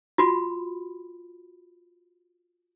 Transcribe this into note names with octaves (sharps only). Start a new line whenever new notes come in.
F4 F#4 B5